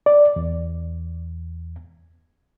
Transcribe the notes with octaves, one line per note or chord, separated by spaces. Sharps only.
D5
E2